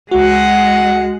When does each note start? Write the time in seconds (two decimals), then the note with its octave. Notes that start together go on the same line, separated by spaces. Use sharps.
0.11 C#2 G#3 F#4 F#5